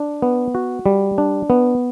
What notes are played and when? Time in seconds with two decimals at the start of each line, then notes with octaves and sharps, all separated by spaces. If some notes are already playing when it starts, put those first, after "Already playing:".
Already playing: D4
0.22 B3
0.55 F#4
0.86 G3
1.18 D4
1.50 B3